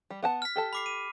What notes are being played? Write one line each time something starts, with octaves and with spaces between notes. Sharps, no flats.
G3
B3 F#5 A5
F6 B6
G4 A4 A5
B5 D6 C7
D#7